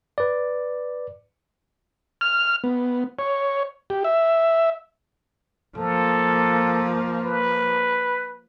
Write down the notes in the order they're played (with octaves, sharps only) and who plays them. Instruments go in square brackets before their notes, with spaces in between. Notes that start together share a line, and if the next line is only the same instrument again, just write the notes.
[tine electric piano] B4 D5
[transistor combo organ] F6
B3
C#5
G4
E5
[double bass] F3 A#3 [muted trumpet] A4
[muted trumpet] B4